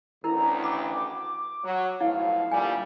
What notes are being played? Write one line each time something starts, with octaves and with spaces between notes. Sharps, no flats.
A1 D2 E4 A#4 A#5
B5 D6
F#3
B1 A2 F3 E4 F5
D2 A#2 G3 G#5